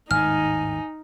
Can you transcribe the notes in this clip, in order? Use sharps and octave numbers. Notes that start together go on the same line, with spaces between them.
G#1 D#2 A2 D#4 G#5 F6